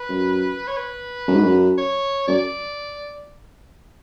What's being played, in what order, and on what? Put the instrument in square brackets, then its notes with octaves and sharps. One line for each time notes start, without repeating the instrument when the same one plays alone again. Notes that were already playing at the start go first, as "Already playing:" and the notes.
Already playing: [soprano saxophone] B4
[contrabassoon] F#2
[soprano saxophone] C#5
B4
[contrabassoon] F#2
G#2
F#2
[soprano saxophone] C#5
[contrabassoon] F#2 [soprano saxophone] D5